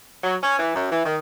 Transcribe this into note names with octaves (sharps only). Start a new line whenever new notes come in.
F#3
C#4
E3
F#2
E3
D#3